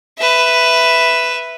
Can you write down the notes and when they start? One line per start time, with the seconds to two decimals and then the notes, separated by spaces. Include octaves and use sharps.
0.19 B4 E5